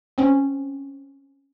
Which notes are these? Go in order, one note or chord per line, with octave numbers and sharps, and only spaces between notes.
C4 C#4